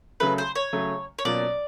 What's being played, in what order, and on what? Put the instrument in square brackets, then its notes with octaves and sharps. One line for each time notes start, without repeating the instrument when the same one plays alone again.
[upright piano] C#3 F#3 A3 [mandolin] B4
[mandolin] C5
C#5
[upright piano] C#3 F#3 A3
[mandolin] C#5
[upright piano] B2 F#3 A#3 C#4 F4 [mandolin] D5